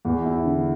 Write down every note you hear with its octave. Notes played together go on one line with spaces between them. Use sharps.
E2
E4
D3